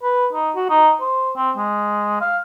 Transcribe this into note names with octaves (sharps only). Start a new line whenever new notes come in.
B4
D#4
F#4
D#4
C5
C4
G#3
F5